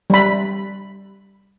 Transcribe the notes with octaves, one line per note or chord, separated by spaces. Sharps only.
G3 B5